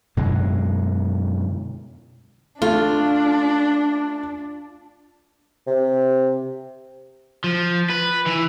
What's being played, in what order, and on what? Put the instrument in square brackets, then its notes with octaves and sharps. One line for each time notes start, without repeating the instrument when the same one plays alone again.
[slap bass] F#2 B2 D3 G#3
[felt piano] A3 [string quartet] D4 [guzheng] F4
[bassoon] C3
[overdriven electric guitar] F3
B4
E3